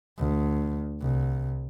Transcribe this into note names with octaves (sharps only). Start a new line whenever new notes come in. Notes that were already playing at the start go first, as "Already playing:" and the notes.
D2
C2